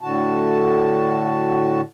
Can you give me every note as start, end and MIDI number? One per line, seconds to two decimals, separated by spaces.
0.01 1.81 45
0.01 1.81 50
0.01 1.81 66
0.01 1.81 81